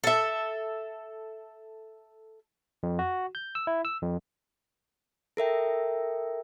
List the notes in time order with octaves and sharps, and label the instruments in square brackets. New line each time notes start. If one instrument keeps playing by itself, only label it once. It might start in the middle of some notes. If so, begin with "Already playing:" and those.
[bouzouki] A4 E5
[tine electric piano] F2
F#4
G6
E6
E4
E6
F2
[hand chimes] A4 A#4 E5 G5